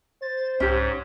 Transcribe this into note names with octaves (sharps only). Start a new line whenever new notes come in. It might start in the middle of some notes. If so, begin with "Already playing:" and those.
C5 A6
C2 G#2 C#4 G4